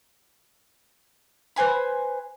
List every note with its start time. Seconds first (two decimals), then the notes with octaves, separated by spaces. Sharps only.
1.56 B4 C5 G#5 B5